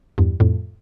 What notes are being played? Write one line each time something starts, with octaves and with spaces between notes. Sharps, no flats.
E2 G2
F2 A2